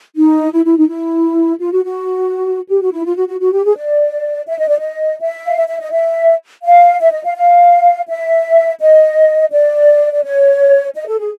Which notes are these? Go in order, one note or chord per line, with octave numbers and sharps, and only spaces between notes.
D#4
E4
E4
D#4
E4
F4
F#4
F#4
G4
F#4
E4
F4
F#4
F#4
F#4
G4
G#4
D5
E5
D#5
D5
D#5
E5
F5
E5
E5
D#5
E5
F5
E5
D#5
F5
F5
E5
D#5
D5
D5
C#5
D#5
A4
G#4